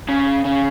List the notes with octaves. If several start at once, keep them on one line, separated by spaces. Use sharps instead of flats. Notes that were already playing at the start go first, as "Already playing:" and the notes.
C#3
C#3